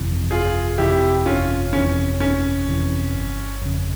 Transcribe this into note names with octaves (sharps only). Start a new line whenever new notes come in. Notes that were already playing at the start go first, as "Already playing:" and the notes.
Already playing: G1 F2 C3 E3
G1 F4 G#4
F2 C3 E3 E4 G4
G1 C#4 F4
F2 C3 E3 C#4
G1 C#4
F2 C3 E3
G1
F2 C#3